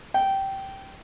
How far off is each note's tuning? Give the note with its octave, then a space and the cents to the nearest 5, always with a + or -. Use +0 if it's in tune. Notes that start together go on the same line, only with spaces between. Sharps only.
G5 -15